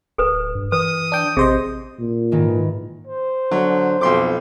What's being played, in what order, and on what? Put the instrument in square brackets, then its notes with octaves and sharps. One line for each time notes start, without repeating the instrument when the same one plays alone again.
[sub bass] D1 [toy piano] A4 B4
[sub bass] G2
[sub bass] E3 [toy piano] B4 [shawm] D#6
[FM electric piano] D4 G5
[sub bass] A1 [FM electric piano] C3 C5 D#5 [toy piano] G#4
[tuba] A#2
[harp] G#2 D#3 E3
[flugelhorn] C5
[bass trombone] D3 [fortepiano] F#3
[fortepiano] B1 C6 D6 [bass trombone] F2